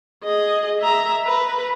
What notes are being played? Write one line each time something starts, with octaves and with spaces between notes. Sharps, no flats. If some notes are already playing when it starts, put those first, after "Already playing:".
G#4 D#5
E5 A#5
B4